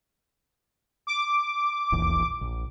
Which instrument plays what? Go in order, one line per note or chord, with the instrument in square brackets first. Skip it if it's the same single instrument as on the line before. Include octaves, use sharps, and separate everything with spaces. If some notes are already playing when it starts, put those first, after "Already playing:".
[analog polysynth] D6
[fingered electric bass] D#1 A#1 E2
A#1